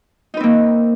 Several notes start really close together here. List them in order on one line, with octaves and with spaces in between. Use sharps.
D#4 B4 C4 A#3